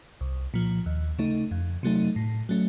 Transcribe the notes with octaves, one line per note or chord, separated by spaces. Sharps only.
C2
A#2 F3
D#2
C#3 A3 D#4
F2
C3 F#3 A3 D#4
A2
F#3 A3 C#4